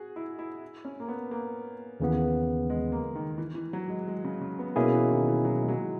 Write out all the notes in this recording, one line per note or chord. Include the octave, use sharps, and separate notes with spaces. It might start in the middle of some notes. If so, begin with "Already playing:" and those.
Already playing: F#4 G#4
E4
E4
C#4
A#3
B3
A#3
D#2 C#3 E3 B3
G#3
A#3
D#3
E3
E3
F#3
G#3
G#3
C#3
C#3
B3
B2 G#3 A#3 C#4 E4 G#4
E3
D#3
E3
F#3
G#3
F#3